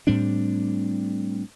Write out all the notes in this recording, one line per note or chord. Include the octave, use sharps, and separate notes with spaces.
A2 G3 C4 D4